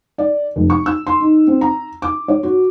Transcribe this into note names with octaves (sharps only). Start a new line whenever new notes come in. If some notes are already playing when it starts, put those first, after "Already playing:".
D5
F1
C#6
E6
C6
D#4
C4
A#5
D6
C#5
F#4